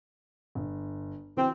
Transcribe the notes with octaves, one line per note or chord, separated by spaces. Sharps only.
G1
E3 C4 F#4